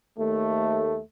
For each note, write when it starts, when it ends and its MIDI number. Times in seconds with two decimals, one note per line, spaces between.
0.18 0.99 39
0.18 0.99 57